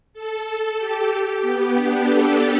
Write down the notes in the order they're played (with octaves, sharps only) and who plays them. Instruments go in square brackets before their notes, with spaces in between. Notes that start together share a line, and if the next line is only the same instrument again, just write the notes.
[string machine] A4
A4
G4
G4
B3
D4
A4